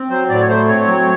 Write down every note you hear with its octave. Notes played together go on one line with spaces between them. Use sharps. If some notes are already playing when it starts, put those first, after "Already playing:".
Already playing: C4
F#3 C5
A2 D5
C#5
A3 C5
C4 C#5
F#3